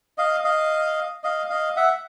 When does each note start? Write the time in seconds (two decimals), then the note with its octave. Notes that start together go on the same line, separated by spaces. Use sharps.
0.18 D#5 F5
0.44 D#5 F5
1.24 D#5 F5
1.50 D#5 F5
1.77 E5 F#5